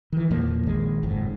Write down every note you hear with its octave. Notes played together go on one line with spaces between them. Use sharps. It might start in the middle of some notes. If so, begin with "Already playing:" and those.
D#3 E3
E2 A#2 F3 A#3
A#1 D#3 G#3
F#1 F2 G#2